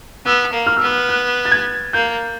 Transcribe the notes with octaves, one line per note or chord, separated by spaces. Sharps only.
B3 E6
A#3
F6
E6
B3 F6
F#6
A6
G#6
A#3 G6